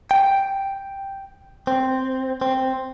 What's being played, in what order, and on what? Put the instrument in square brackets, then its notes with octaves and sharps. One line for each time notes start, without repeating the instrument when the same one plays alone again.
[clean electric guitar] G5
C4
C4